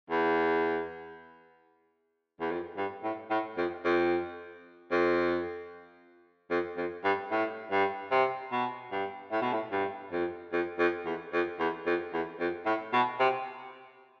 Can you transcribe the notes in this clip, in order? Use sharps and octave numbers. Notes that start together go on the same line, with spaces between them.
E2
E2
F2
G2
A2
A2
F2
F2
F2
F2
F2
G2
A2
G2
C3
B2
G2
A2
B2
A2
G2
F2
F2
F2
E2
F2
E2
F2
E2
F2
A2
B2
C3